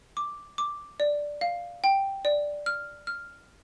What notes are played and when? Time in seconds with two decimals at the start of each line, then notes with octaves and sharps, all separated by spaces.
0.17 D6
0.58 D6
1.00 D5
1.41 F5
1.84 G5
2.25 D5
2.66 F6
3.07 F6